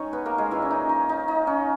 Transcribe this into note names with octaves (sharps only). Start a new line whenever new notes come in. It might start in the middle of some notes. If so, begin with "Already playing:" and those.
Already playing: D#3 G#3 C#4 D#4 C#5 D#5
B3 B4
A#3 A#4
G#3 G#4
A#2 E3 A#3 C#4 E4
C#4
D#4
D#4
D#4
D#4
C#4